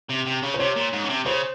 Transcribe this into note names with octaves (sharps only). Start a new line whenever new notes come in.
C3
C3
C#3
C5
C3 C#5
A#2
G#2
C#3
C3
C#3 C5